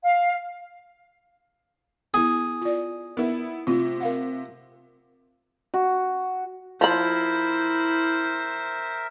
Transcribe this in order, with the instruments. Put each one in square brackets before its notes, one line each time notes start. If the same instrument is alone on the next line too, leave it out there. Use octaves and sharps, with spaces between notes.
[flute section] F5
[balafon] B3 E4 [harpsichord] G#4
[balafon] F4 D5
[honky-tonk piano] B3 E4 [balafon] A#4
[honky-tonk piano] C3 [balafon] A3 F4
[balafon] A#4 F5 F#5
[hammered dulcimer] F#4
[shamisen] F3 B5 [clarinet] E4 [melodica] A#4 E5 [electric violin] C5